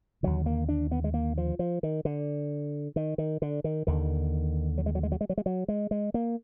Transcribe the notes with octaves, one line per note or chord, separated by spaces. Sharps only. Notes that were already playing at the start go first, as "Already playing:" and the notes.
D#2 D3 F#3
A#3
D4
B3
G#3
A#3
F3
F3
D#3
D3
D#3
D#3
D3
D#3
D#2 D3 D#3
F#3
G#3
F#3
G#3
F#3
G#3
F#3
G#3
F#3
G#3
G#3
A#3